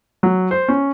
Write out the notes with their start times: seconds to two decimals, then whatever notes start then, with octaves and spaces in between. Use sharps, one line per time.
0.23 F#3
0.51 C5
0.68 C#4